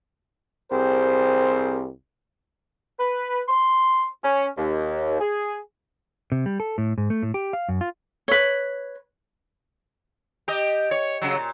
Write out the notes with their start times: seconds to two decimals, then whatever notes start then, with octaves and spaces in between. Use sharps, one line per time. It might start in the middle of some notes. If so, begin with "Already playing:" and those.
0.72 C2 C4 G4 G#4 A#4 C5
2.99 B4
3.48 C6
4.24 C#4
4.58 D#2
5.20 G#4
6.32 C3
6.46 G3
6.60 A4
6.78 A2
6.98 G#2
7.10 A3
7.23 A2
7.34 G4
7.53 F5
7.69 F#2
7.81 F4
8.28 B4 C#5
10.48 G4 D#5
10.91 C#5
11.22 C#3 F#3
11.37 A#2